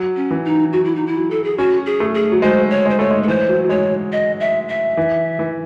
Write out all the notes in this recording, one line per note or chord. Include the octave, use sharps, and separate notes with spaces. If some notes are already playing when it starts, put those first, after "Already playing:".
Already playing: F#3
C#4
E3
D#4
F#3 F#4
E4
D#4
E4
F#3
A4
G#4
C#4 F#4
G#4
A3
G#4
F#3
G#3 C5
C#5
G#3 C5
A3 C#5
G#3
A4
E3 C5
F#3
F#3
G#3 C#5
F#3
D#5
E5
E5
E3
E3